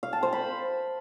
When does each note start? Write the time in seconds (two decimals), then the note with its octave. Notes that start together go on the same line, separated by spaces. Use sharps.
0.03 F5
0.13 A5
0.23 C5
0.33 B5